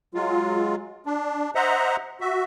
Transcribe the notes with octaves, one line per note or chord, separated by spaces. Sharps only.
F#3 G#3 F4
D4
C5 D#5 E5 F#5 A#5
F#4 E5